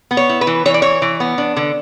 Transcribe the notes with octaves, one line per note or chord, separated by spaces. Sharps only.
B3
C#5
E4
B4
E3
E3 C#5
D5
E3 C#5
E3
B3
D4
D3